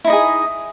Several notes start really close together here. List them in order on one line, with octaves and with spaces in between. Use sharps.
E4 D#4 D#5 G#4